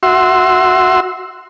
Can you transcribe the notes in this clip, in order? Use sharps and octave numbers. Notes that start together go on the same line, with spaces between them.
F#4 E5 C6